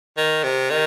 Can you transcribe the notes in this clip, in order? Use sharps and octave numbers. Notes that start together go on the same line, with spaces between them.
D#3
C3
D#3